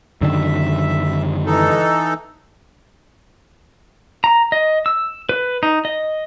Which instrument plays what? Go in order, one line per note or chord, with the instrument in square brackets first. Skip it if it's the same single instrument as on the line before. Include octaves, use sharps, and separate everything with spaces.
[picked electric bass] F#2 D3 D#3 [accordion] E5
[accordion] E3 D#4 A4
[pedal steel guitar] A#5
D#5
E6
B4
D#4
D#5